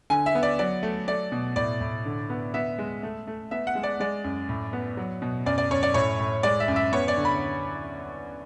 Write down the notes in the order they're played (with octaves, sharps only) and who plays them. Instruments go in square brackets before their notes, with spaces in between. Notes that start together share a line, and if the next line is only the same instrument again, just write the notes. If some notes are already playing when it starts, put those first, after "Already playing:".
[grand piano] D3 G#5
E5
B3
D5
F#3 D5
A3
A3 D5
B2
A2 D5
A2
D3
B3
B3 E5
G#3
A3
A3
B3 E5
F#5
G#3
D5
G#3 D5
F#2
A2
B3
F#3
B2
F#2 D5
D5
F#2 C#5
D5
A2 C#5
A2
G#3 D5
E5
F#2
E5
B3 C#5
D5
D3
B5